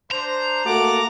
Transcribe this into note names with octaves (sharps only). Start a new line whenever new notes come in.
D4 C5 A#5
A3 A#3 F#4 F#5 A5 D6